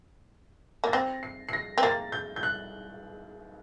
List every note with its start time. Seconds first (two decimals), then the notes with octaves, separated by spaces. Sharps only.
0.84 A#3 A6
0.93 C4 A#6
1.23 C7
1.49 C7
1.53 A#6
1.78 C4
1.83 A#3 A6
2.12 G6
2.36 G6
2.43 F#6